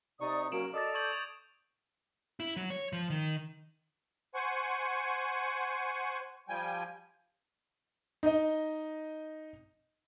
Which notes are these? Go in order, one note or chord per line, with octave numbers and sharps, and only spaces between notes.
C3 D#4 D5 C#6 D#6
F#3 A#3 C#4 F#4 A#4 D7 E7 F#7
A4 D5 D#5 D6 D#6 A6
C#6 G6 G#6 F#7
F7
E4
F#3
C#5
F3
D#3
C5 F#5 G#5 C#6
F3 G3 G5 G#5
D#4 D#5